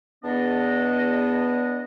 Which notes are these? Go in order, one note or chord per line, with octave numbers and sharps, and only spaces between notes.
E2 B3 D4 D#5